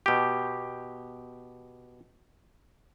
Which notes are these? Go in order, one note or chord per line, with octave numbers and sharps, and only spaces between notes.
B2 G4